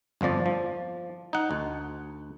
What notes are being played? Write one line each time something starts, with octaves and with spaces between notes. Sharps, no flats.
G1 F2 F3 D5 A5
F3
D#4 F#5
D2